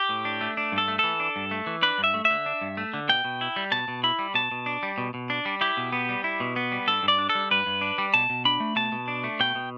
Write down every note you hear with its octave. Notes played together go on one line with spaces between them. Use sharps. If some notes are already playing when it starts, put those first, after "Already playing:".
Already playing: G4
A2
D4
A3
D4
G2
A4
A3
E3 A4
D4
G2
A3
E3
D4 B4
G2
E5
A3
E5
D3
D4
G2
A3
D3
B2 G5
B2
E4
G3
B2 A5
B2
E4 B5
G3
B2 A5
B2
D4
G3
B2
B2
D4
G3
E4 G4
B2
B3
G3
E4
B2
B3
G3
G2 A4
G2
D5
D4
A4
G3
G2 B4
G2
D4
G3
B2 A5
B2
D4 B5
A3
B2 A5
B2
D4
A3
B2 G5
B2